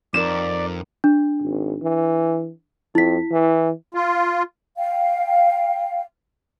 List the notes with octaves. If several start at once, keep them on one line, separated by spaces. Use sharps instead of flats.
F2 D#4 A#4 D5 E7
D4
G#1
E3
F2 E4 B6
E3
F4
F5 G5